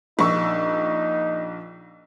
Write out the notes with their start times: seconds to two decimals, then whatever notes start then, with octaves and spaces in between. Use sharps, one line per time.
0.19 A#1 D#4 C#6 E6